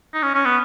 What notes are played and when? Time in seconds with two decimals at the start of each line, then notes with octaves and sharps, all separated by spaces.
0.14 D#4
0.23 C#4
0.34 C#4
0.45 B3